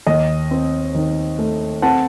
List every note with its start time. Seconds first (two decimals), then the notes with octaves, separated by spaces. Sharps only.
0.07 D#2 D#5
0.51 C4
0.95 D#3
1.39 A3
1.82 C4 F#5 A5